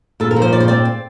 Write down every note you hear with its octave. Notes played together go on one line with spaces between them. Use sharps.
A#2 A4
A#4
F3
C5
A#2 D5
C5
C4 D5
C4